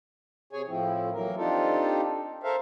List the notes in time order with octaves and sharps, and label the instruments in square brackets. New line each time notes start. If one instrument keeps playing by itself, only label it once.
[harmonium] C3 G#4 C#5 G#5
A2 F3 C4 E4
E3 F#3 A#3 A#4
C4 D4 D#4 F4 G4 A4
A4 A#4 C5 E5 F5